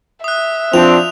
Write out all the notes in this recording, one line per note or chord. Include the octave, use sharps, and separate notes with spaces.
E5 D#6 F#6
F3 C4 D4 F7